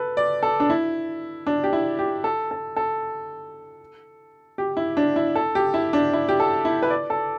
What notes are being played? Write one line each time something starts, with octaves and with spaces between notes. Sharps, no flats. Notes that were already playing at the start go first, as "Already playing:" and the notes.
Already playing: A4 B4
D5
A4
D4
E4
D4
G4
E4
G4
A4
A4
A4
G4
E4
D4
E4
A4
G4
E4
D4
E4
G4
A4
E4
B4
D5
A4